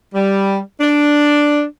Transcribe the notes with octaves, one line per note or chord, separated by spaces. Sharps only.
G3
D4